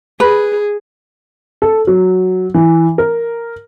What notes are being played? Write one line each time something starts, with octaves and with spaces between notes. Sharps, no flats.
G#4 B4
A4
F#3
E3
A#4